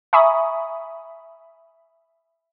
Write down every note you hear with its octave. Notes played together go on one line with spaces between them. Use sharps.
E5 G#5 A#5 B5 C#6 D#6